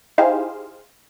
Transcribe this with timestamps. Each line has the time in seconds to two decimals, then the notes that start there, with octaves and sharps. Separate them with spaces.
0.18 D#4 E4 G4 G#4 C5 F5